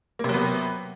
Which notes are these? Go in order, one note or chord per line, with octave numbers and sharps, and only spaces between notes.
C3 F#3 A#3 B3